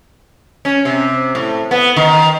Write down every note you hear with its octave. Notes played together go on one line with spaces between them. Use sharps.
C#4
C3
A2
B3
D#3